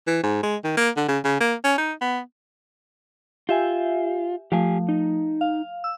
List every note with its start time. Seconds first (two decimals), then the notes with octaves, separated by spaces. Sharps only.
0.07 E3
0.23 G#2
0.43 G#3
0.64 D#3
0.77 A#3
0.97 D3
1.08 C#3
1.24 C#3
1.40 A#3
1.64 C#4
1.78 D#4
2.01 B3
3.49 F4 G4 E5 G#5
4.52 F3 A3 G4 F5 G#5
4.89 D#4
5.41 F5
5.84 E6